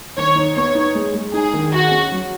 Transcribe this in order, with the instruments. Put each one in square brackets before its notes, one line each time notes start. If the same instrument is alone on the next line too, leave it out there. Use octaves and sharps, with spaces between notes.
[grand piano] D#3 [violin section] C#5
[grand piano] D#4
[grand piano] B3 [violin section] C#5
[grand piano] D#4
G#3
G#3
[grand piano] D#4 [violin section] G#4
[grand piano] D#3
[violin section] F#4 [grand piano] G#4
[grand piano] C#4
F#3